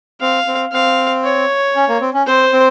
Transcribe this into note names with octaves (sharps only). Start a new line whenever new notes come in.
C4 F5
C4
C4 F5
C#5
C#4
A#3
C4
C#4
C4 C5
C4